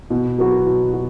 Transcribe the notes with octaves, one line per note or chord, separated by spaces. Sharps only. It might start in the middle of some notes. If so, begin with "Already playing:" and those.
B2
F#3 B3 F#4
B2
F#4